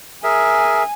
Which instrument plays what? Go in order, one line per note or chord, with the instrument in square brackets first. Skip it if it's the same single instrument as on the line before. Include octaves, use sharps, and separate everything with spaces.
[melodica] G#4 A#4 E5 [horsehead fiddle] G#5